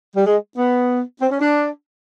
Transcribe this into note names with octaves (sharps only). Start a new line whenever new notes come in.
G3
G#3
B3
C4
C#4
D4